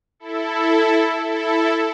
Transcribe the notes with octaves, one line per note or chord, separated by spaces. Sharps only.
E4 A4
E4 A4